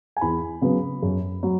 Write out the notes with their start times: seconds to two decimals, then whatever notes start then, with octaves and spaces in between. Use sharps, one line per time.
0.17 G#5
0.21 E2 B5
0.62 C#3 F#3 B3
1.02 F#2
1.43 F#3